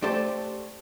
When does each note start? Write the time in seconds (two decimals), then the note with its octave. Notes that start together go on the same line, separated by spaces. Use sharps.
0.02 A3 G4 A4 C5 D5 A5